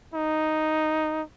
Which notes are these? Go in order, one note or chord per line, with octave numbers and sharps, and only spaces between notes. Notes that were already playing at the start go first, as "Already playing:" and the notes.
D#4